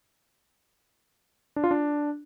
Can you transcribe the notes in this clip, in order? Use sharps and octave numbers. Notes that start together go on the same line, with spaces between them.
D4
F4
D4